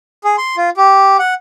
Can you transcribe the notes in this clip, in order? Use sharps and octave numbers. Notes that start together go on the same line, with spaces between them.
G#4
C6
F4
G4
F#5